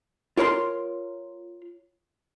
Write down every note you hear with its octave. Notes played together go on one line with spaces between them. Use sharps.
F4 A#4 C#5 A#5 C6